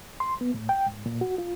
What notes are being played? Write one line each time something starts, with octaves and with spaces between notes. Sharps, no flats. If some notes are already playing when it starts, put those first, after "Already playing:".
C6
B3
A2
G5
G#2
A#2
F#4
F4